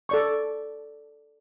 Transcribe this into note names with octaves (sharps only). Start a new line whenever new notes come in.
A4 D5 C#6